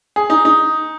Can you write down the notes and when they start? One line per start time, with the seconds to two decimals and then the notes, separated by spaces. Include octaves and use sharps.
0.16 G#4
0.30 D#4
0.45 D#4